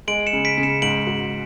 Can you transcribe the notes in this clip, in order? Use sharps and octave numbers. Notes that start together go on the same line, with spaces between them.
G#3 D7 F#7
C#7 E7
C#3
B6 D7
C#3
C#7 E7
G#2 D7 F#7
F#4